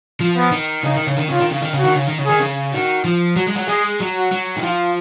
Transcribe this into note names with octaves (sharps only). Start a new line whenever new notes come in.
F3
B3
D#3
C#3 D#4
D#3
C#3
D#3
C#3 F4
D#3
C#3
D#3
C#3 F#4
D#3
C#3
D#3
C#3
D#3 G#4
C#3
D#3 F#4
F3
F#3
G#3
F#3
G#3 G#4
F#3
F#4
F#3
D#3
F3 F4